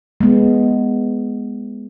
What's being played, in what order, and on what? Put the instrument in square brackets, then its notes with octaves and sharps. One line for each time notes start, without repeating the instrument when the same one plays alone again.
[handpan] G#3 B3